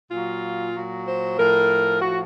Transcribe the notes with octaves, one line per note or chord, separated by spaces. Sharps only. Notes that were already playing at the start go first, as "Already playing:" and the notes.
A#2 F#3 F4
A#2 F#3
C5
A2 F3 A#4
A2 F3 F#4